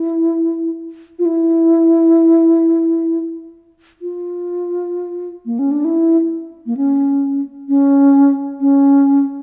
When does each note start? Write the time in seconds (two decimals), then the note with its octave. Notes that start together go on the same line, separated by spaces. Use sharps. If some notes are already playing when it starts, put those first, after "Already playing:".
Already playing: E4
1.19 F4
1.26 E4
4.02 F4
5.46 A#3
5.59 C#4
5.71 D4
5.85 E4
6.66 A#3
6.77 C#4
7.69 C#4
8.61 C#4